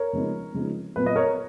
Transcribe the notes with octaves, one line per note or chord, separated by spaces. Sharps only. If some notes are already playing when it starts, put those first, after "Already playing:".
Already playing: A#4 C#5
C#3 F3 G#3 B3 D#4
C#3 F3 G#3 B3 D#4
A#2 F#3 B3 B4
D#5
A#4 C#5